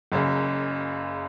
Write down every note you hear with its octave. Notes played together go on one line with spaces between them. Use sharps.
F#1 F#2 C#3